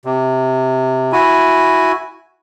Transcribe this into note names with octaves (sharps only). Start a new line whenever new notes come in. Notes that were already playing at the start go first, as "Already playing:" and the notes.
C3
E4 F#4 G#5